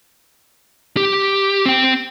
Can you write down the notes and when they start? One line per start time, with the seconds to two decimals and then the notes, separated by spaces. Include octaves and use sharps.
0.97 G4
1.65 C4 G5